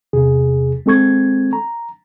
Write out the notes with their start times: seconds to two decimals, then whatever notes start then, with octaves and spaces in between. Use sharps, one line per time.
0.13 E2 C3 G#4
0.86 G#3 C4 A4 C#6 G#6
1.53 A#5